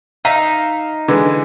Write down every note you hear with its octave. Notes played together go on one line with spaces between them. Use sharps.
D#4 E5 F5
D3 E3 G#3